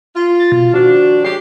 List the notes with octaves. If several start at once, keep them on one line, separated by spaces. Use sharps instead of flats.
F4
A6
B2
D#3 F3 D4 F#4
G#3 C#4 G4 C7